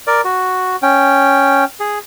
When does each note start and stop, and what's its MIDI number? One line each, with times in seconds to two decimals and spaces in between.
0.07 0.21 70
0.07 0.21 74
0.25 0.76 66
0.82 1.64 61
0.82 1.64 79
1.80 1.99 68